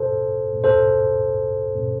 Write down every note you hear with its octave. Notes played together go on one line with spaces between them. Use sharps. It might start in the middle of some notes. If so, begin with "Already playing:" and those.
Already playing: A4 C5
A4 C5